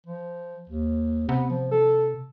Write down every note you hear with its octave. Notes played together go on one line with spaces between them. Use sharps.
F3
D#2
C3 B3
F3
A4